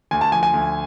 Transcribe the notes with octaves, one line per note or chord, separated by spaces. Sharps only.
D2 G#5
A5
F3 G#5
G#5
D2